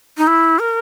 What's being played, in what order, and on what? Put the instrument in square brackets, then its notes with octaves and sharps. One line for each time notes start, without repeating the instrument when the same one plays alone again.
[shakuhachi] D#4
E4
A#4